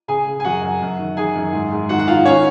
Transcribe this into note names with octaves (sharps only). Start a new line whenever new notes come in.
C#3 G#4 G#5
C#3
G#5
F#2 F#4 F#5
F#2
F#2
D#3
D#3 G#4 G#5
F#2
G#2
G#2
D#3 F#4 F#5
F#5
D#3 F4 F5
D#3 C#4 C#5